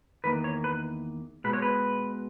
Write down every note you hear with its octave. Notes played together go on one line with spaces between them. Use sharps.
E2 D#3 A#3 B4
C#5
B4
B2 G#3 B4
C#5
B4